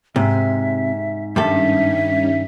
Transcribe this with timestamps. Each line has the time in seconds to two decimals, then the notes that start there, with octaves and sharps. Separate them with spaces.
0.16 G#2 C3 E5
1.36 G2 D#3 G3 C#4 D#4 A4 E5